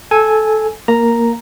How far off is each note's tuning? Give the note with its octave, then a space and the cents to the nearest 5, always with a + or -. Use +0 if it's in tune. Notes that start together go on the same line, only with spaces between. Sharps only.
A4 -15 G#5 +0
A#3 +0 A#5 +0